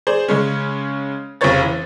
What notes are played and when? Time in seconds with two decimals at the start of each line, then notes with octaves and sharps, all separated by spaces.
0.07 G#4 C5 D5
0.28 C#3 G#3 C#4
1.41 F1 C#3 F4 C5 C#5 A6
1.63 E3